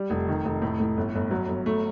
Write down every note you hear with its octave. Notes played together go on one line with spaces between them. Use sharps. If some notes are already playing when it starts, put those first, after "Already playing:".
Already playing: G3
F1
D#3
F1
A2
A2
G1
G1
F#3
G1
A3